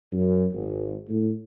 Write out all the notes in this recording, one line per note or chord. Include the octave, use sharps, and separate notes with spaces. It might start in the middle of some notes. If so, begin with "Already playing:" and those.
F#2
G#1
A2